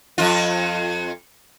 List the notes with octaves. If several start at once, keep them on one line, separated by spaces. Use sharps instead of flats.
F2 F4